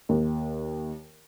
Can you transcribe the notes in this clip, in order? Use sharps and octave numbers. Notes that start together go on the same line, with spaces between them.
D#2